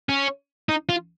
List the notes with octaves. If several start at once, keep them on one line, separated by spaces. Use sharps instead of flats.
C#4
D#4
F4